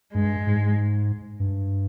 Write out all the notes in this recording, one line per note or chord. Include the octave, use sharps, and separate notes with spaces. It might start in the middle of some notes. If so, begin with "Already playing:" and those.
G2 G#3
G#2
G2